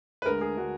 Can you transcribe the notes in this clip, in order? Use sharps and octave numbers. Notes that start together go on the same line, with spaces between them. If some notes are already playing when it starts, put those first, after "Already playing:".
B4
D2 D3 G#3 A#4
G#4
D3 G#3 F#4